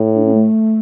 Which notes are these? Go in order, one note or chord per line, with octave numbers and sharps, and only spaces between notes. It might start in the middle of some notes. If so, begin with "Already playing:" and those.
Already playing: A2
D4
C#4
A3